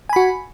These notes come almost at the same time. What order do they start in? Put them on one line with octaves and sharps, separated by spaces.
G#5 B5 F#4